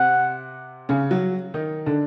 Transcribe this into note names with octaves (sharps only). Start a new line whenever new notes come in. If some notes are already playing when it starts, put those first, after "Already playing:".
Already playing: C3 C4 F#5
C#3 C#4
F#3 F#4
D#3 D#4
D3 D4